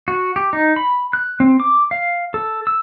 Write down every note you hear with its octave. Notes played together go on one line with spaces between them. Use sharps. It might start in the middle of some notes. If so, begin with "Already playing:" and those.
F#4
G4
D#4
B5
F#6
C4
D6
F5
A4
E6